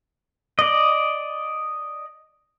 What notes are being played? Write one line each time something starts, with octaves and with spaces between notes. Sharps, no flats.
D5 D#5